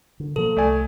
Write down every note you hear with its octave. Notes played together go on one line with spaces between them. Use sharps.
D3
B2 F3 A#3 A4
C2 A3 D5 G#5